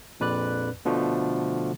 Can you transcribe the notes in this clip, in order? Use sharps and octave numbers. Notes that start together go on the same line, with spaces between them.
A#1 F2 B4 D5 F#6
B2 D3 F3 A3